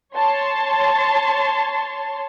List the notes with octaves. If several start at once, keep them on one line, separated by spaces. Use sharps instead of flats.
C#5 A5 C6